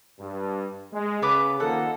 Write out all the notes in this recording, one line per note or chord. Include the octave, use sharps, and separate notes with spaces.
G2
G#3
C#3 B3 B4 D6
D#3 F3 A#3 A4 F#5